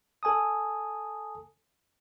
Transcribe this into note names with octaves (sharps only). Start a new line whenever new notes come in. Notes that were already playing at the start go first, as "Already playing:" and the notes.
A4 G#5 A5 D#6